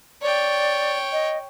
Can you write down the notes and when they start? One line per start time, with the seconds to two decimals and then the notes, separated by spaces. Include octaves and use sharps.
0.22 C#5 D5 G5
1.12 D#5